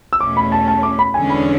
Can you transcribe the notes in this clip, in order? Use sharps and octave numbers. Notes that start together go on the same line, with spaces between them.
E6
E2 B2 A3 C#4 D6
B5
A5
A5
D6
B5
E2 D3 G#3 C#4 G#5
B5